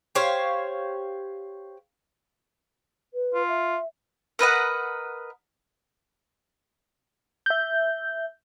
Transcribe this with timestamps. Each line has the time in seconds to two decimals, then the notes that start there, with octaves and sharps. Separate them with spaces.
0.15 G4 C5 C#5 F5
3.13 B4
3.34 F4
3.48 E5
4.39 A#4 B4 D#5 F#5
7.46 E5 G6